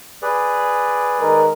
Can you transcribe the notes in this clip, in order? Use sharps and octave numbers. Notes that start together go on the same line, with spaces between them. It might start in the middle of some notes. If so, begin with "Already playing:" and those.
G#4 B4 D5
D#3 G#3 A#4